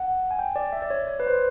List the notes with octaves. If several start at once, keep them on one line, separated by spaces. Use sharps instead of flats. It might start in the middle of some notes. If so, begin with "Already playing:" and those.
Already playing: F#5
G#5
G5
D5
E5
D5
C#5
D5
C#5
B4
C5
B4